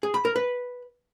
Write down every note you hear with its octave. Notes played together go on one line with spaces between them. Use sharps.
G#4
B5
A#4
B4